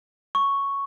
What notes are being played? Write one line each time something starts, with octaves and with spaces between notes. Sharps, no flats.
C#6